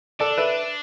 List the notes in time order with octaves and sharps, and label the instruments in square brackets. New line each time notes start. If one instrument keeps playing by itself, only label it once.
[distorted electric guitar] D4 [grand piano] A4 D5
[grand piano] B4 E5